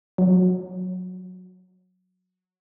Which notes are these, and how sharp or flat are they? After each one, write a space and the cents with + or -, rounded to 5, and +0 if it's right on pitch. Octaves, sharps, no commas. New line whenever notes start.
F#3 -15